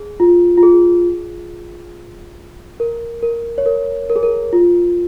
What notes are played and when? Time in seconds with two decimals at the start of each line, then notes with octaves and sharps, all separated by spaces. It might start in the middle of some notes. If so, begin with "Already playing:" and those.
Already playing: G#4
0.20 F4
0.58 F4
0.63 G#4
2.80 A#4
3.23 A#4
3.58 C#5
3.66 A#4
4.10 A#4
4.16 G#4
4.23 A#4
4.53 F4